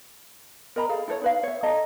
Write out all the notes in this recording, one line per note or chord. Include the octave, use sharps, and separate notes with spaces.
A#4 D#5 A#5 B5
G#4 A4 F5
E4 A4 C5 C#5
D#4 B4 F5
C#5 E5
A4 D#5 A5 A#5